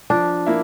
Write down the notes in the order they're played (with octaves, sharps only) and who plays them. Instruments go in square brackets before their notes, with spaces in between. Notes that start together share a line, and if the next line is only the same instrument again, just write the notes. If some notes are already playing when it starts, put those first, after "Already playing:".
[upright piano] F3 [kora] D4
[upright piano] A#3 E4